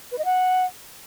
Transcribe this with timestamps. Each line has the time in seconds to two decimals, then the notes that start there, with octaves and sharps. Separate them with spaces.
0.12 B4
0.18 D#5
0.25 F#5